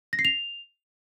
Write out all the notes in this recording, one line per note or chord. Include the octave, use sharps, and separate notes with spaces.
A#6
C7
F7